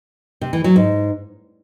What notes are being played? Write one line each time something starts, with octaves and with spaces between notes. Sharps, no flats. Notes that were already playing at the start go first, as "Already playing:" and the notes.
C3
E3
F#3
G#2